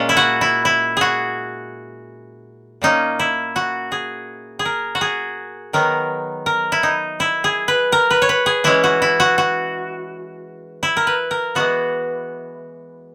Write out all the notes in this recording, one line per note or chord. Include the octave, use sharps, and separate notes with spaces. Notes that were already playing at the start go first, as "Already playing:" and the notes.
Already playing: A#2 G#3 C#4 G#4
E4
F#4
E4
E4
F#4 G#4
A#2 A#3 C#4 D#4
E4
F#4
G#4
G#4
A#4
F#4
G#4
D#3 F#3 B3 A#4
A#4
E4
D#4
E4
G#4
B4
A#4
B4
C#5
B4
G#4
E3 G#3 C#4 E4
F#4
E4
F#4
F#4
E4
A#4
B4
A#4
E3 G#3 B3 F#4